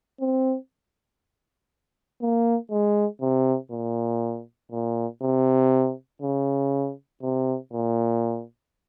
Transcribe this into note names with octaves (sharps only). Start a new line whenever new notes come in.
C4
A#3
G#3
C3
A#2
A#2
C3
C#3
C3
A#2